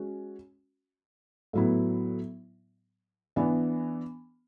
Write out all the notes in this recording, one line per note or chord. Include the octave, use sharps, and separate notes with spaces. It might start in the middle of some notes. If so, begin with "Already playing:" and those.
Already playing: G#3 C#4 F#4
A2 F#3 B3 E4
E3 B3 D4